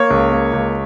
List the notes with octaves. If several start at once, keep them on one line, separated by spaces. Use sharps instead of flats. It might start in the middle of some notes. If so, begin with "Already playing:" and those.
Already playing: A#3 C#5
C#2
A#3
C#2